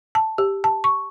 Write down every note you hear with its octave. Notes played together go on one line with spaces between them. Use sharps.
A5
G4
A5
C#6